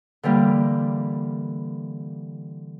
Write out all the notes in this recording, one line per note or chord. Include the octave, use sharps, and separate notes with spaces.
D3 E3 G3 A#3